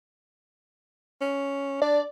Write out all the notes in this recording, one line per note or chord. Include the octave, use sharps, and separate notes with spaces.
C#4
D4 D5